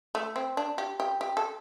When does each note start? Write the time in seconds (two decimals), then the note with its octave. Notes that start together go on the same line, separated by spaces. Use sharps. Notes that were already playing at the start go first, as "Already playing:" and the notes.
0.15 A3
0.36 C4
0.57 D4
0.78 G4
1.00 G4
1.21 G4
1.37 A4